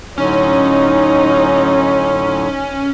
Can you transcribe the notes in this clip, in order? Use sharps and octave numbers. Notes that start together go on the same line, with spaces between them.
A2 D3 F#3 C#4 D#4 C#5